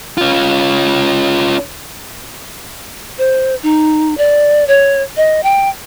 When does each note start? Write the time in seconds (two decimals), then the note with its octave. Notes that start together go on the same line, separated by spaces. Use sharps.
0.18 C#4 F4
3.18 C5
3.63 D#4
4.18 D5
4.68 C#5
5.17 D#5
5.43 G5